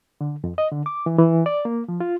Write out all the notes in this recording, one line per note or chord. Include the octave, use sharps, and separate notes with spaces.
D3
F2
D#5
D3
D6
E3
E3
D5
A#3
F3
F4